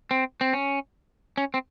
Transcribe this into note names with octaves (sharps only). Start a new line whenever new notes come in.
C4
C4
C#4
C#4
C4